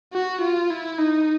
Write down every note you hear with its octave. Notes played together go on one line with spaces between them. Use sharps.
F#4
F4
E4
D#4